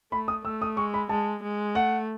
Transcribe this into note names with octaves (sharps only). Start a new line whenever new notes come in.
A3 B5
D#6
A3 E6
D#6
G#3 C#6
B5
G#3 A5
G#3
A3 F#5